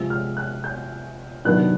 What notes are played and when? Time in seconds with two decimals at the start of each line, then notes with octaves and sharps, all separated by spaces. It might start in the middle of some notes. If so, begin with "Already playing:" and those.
Already playing: C3 F3 G#3 E6
0.10 F6
0.37 F#6
0.64 G6
1.45 C3 D#3 F#3 B3 D4 F#6